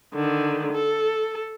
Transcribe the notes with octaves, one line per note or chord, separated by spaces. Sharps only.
D3 D#3
A4